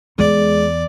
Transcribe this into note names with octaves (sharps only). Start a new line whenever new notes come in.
E2 G#3 D5